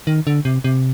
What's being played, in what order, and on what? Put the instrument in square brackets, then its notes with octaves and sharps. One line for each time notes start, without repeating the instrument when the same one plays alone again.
[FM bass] D#3
D3
C3
C3